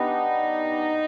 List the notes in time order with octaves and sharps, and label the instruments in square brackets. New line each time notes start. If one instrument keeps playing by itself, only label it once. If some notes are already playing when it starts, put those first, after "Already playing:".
Already playing: [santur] G3 B3 D4 [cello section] D#4